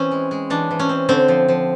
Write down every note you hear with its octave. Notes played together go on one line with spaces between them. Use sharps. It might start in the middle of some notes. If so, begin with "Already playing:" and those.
Already playing: E3 C4 C#4
G#3
G#3
E3 D4
E3
C#4
C4
D3 C4
F3
F3